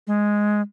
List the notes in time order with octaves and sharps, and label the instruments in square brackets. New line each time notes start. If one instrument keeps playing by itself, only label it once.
[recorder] G#3